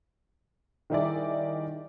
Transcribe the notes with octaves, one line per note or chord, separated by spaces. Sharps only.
D#3 G3 D#4 E4 G#4 D5